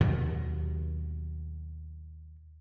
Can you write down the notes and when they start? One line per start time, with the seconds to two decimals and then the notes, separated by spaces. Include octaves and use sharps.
0.01 D#2 B2 F#3